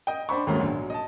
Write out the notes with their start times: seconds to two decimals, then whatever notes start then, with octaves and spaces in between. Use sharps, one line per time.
0.07 D#5 G5
0.29 D4 C5 B5 C#6
0.47 D#2 G#2 D#3 F#3 A3 C#4
0.60 A#1 B2 F#3
0.90 D#5 A5